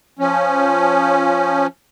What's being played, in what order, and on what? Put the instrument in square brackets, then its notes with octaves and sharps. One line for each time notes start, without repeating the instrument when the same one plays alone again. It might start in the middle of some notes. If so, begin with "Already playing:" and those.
[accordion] F3 C#4